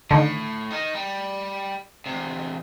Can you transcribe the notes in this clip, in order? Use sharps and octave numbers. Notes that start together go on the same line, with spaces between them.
A2 D3 D#3
D#4 A#4
G3
E2 C3